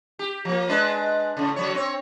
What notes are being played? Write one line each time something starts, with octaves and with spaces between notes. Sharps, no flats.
G4
F3 A#3
G#3 D4 B4
A2 C#3
D3 F#3 C#5
C4 C#5